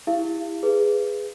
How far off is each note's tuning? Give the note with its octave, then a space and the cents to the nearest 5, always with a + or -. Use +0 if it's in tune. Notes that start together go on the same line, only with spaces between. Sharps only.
E4 +0 G4 +30 F5 -35
G#4 -5 B4 +5